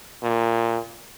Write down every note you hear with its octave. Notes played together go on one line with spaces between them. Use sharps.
A#2